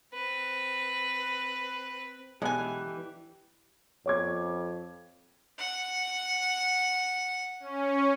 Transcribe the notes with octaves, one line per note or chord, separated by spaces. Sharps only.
C4 B4
B1 D3 E3 G#3 G4 G#5 F#6
F2 C#5 D6 G#6
F#5
C#4